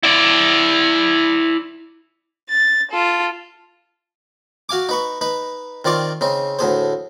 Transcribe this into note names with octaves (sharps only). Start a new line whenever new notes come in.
E4 D5
A6
F4 A4
F#4 F5 G#5 D6
D#4 B4 C#6
D#4 B4
D#3 C4 F4 D5 C#6
C#3 C4 D#4
D2 A2 G#4 C5